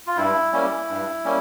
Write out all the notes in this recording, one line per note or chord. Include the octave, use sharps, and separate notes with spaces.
F4
G2 E4
G3 A#3 C#4
G2
G3 A#3 C#4